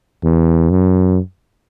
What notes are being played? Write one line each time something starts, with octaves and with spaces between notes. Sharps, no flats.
E2
F#2